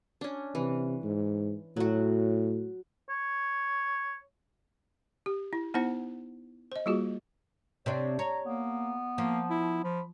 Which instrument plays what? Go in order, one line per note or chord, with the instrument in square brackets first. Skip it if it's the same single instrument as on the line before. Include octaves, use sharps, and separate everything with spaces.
[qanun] C#4 D4
[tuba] C3 [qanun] E3
[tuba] G#2
[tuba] A2 [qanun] F#3 F#4
[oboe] C#5
[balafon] G4
E4
B3 D#4 E4 C5 F#5
C5 D#5
G3 A#3 F4 F#4 G#4
[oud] C3 C4 D4 [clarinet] C#5
[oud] C#5 [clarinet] A#5
[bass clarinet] A#3 [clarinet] B3
[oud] F3 [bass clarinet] A#3
[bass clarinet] E4
[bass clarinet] F3 [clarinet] B5